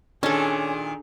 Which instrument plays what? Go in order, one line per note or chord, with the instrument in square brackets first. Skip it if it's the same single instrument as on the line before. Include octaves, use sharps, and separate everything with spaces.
[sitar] A#2 D#3 [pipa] C#4 [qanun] D4 A4 [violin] G#4